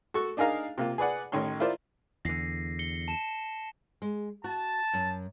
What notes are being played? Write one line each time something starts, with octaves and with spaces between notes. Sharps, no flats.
F#4 A4 C#6
D4 D#4 G#4 A#4 F5 A#5
C3 A#3 F4
G#4 B4 D5 F#5
A1 D#3 C#5 C6
E4 F4 A#4 C5 D5
E2 D3 A#6 C7
C#7 G7
A5 E7
G#3
F#4 A5
F#2